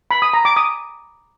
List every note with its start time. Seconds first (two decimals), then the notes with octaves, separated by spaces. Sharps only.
0.11 B5
0.22 D#6
0.34 A#5
0.45 D6
0.56 D#6